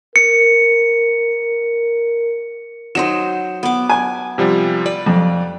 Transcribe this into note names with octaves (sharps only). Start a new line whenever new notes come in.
A#4 C#7
F#3 D#4 C5 E7
B3 D6
G#5
C3 F3 G3
B4 D5
F2